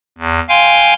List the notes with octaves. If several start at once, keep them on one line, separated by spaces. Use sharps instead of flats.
E2
F5 G5 G#5 C6